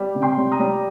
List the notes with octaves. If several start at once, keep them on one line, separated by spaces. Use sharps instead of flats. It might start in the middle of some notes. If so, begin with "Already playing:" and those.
Already playing: G3
C3
G5 C6
G3
A#5 D#6
G3